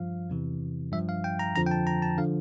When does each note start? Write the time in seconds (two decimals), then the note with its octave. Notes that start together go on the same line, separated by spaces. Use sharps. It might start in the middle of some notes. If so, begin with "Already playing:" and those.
Already playing: G2 F3 F5
0.30 E2 C3 E3
0.92 G2 F3 E5
1.09 F5
1.24 G5
1.39 A#5
1.55 F2 D3 F3 A#5
1.66 G5
1.71 A5
1.87 A#5
2.02 A5
2.18 D3 F3 F5